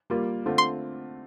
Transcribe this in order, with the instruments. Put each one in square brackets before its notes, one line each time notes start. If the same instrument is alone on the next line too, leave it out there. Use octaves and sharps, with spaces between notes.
[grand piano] G3 A#3 F4 A#4
D3 A3 C4 F4
[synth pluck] C6